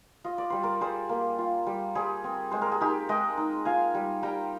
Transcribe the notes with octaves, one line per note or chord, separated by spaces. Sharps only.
F4 D#5
D5
G3 C5
A#4 D5
G3 G#4 C5
A#3
F4
G3
G3 G#4 C5
C4
G#3 C5
A#4
G#4
D#4 G4 A#4
G#3 D#5 G5
D#4
F4 F5 G#5
G3
G3 G5 A#5